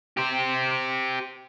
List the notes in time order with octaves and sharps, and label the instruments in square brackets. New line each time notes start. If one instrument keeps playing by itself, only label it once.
[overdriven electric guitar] G4 C5